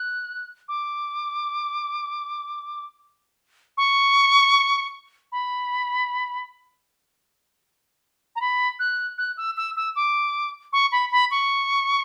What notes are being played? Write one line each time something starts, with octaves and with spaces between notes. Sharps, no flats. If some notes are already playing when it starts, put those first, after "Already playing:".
Already playing: F#6
D6
C#6
B5
A#5
B5
F#6
F#6
E6
E6
E6
D6
C#6
B5
B5
C#6